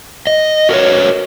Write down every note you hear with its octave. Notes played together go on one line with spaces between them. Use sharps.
D#5
F#4 A#4 B4 C#5